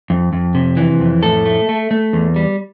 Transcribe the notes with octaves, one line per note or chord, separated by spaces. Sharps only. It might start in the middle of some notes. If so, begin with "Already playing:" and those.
F2
F2
C3
E3
F2
A2 A4
A3
A3
A3
E2
G3